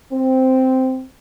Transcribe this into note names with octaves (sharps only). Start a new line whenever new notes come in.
C4